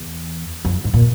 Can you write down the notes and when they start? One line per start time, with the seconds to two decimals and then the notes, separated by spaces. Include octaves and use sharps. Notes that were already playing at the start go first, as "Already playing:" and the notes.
Already playing: E2
0.65 F2
0.84 G#2
0.94 A#2